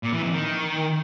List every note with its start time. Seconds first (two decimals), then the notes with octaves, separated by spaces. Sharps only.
0.03 A#2
0.13 E3
0.23 F2
0.33 D#3